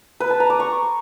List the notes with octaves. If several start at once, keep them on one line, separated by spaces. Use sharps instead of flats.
B4
A5
A#5
D6
C#6